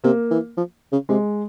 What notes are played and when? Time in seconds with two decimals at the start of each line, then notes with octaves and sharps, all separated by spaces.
0.04 C3 A#3
0.30 E3
0.57 F3
0.92 C#3
1.09 C3 G#3